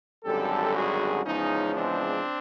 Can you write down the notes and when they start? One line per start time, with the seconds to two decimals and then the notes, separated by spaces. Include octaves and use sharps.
0.24 G#1 F#2 D3 G3 G4 A4
0.74 F#4 G#4
1.24 E2 C#3 F3 G#3 C#4 D#4
1.74 C4 D4